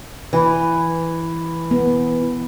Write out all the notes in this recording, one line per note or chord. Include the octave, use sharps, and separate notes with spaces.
E3
B3